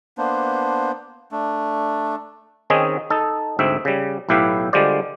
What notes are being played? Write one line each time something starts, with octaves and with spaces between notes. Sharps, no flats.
A#3 B3 D4 C5
A3 D4
D#3 C4 C#4 D#4 G#4
D#4 A4
D2 G#2 C4 E5
C#3 G3
B1 A2 E4 G4 B4 F5
D3 G3 G#3 F4 C5 D5